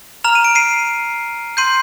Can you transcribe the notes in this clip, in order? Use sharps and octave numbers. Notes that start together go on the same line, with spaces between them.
A#5 F6 F7
D#7
D7
C7 D#7
C6 G6 C7 D#7